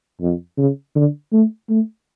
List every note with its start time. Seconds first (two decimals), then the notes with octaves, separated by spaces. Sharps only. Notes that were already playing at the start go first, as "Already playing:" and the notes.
0.21 F2
0.57 C#3
0.96 D3
1.32 A3
1.69 A3